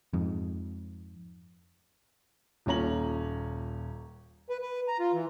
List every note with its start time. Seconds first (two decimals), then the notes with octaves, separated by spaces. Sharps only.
0.13 F2 G#2
2.66 D#1 A#2 C#4 A#5 F#7
4.49 B4
4.62 B4
4.88 A#5
4.99 F4
5.13 E3